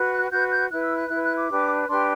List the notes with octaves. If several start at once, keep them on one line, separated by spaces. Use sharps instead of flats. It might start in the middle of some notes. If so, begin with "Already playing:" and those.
Already playing: F#4 B4
F#6
F#4 B4 G6
G6
E4 B4 F#6
E6
F#6
E4 B4 F#6
F#6
D6
D4 G4 B4
D4 G4 B4 C6